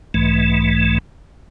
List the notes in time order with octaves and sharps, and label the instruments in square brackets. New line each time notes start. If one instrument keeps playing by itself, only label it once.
[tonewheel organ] B1 G#2 E3 A3